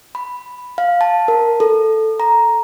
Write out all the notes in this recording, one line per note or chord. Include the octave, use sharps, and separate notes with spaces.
B5
F5
A5
A#4
A4
A#5